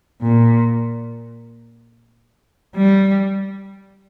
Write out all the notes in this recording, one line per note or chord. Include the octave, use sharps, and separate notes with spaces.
A#2
G3